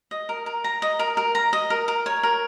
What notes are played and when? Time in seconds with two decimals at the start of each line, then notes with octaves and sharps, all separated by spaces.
0.11 D#5
0.29 A#4
0.46 A#4
0.64 A#5
0.82 D#5
0.99 A#4
1.17 A#4
1.35 A#5
1.53 D#5
1.70 A#4
1.88 A#4
2.06 C#5
2.23 A#4